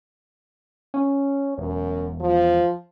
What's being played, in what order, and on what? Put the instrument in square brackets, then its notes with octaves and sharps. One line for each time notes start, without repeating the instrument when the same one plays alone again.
[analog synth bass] C#4
[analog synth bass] E1 [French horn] F#2
[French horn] F3